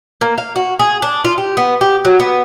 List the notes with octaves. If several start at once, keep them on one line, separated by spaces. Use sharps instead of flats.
A#3
F5
F#4
G#4
D4
F4
G4
B3
G4
F#3
B3